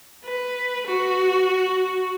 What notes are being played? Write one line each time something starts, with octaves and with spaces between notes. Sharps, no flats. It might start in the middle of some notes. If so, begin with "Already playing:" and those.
B4
F#4